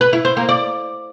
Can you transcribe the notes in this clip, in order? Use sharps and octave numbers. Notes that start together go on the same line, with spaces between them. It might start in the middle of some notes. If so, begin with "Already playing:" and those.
B4
E4
C5
A#3
D5